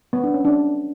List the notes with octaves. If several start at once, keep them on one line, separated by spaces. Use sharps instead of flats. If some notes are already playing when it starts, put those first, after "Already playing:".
B3
D4
C#4
D4